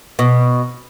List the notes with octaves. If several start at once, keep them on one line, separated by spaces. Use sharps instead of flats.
B2